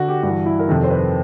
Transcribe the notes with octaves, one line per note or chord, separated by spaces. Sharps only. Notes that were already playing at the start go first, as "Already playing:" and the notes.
Already playing: D3 F#4
G4
G2 E3 F#4
E4
A#4
F2 C3 D#3 A4
C5
B4